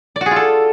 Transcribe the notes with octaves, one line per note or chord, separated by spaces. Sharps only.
D5
F#4
G#4
F4
A4